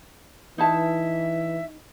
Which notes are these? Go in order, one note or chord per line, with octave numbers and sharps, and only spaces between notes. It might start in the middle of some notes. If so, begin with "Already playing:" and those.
E3 D#4 E4 E5 A5